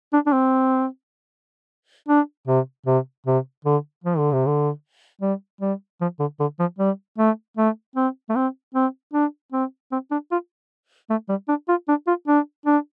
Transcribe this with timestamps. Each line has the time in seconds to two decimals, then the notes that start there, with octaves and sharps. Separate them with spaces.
0.13 D4
0.26 D4
0.32 C4
2.08 D4
2.47 C3
2.86 C3
3.26 C3
3.64 D3
4.04 F3
4.18 D3
4.33 C3
4.47 D3
5.21 G3
5.61 G3
6.01 F3
6.19 D3
6.40 D3
6.59 F3
6.78 G3
7.18 A3
7.57 A3
7.95 C4
8.29 A3
8.35 C4
8.74 C4
9.13 D4
9.52 C4
9.92 C4
10.11 D4
10.31 F4
11.10 A3
11.29 G3
11.48 D4
11.68 F4
11.88 D4
12.07 F4
12.27 D4
12.65 D4